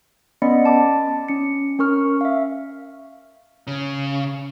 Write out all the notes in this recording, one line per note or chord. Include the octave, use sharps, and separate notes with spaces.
B3 C#4 D5 D#5 B5 C#7
A5 D6
C#4 C#7
C#4 A#4 C#6 F6
E5 F5
C#3